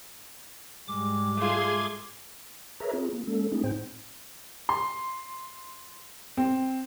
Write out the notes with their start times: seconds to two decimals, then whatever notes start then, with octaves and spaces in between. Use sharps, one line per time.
0.88 G#2 G3 G#3 D6
1.37 A3 F4 G#4 C6 G#6
2.80 G#4 A#4 B4 C#5 E5 A#5
2.93 C4 F4 G#4
3.13 A#3
3.27 G#3 A#3 C#4 A4
3.52 A3 C4 D4 E4 G#4
3.63 A2 C4 D#4 C5 G5
4.69 C6
6.37 C4